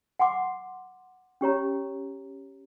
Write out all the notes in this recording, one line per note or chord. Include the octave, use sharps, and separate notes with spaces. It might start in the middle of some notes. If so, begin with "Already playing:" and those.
F#5 G#5 C6 D6
C#4 G4 C#5 A#5